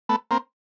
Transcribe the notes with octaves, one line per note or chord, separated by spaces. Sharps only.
A3 B3
A#3 C4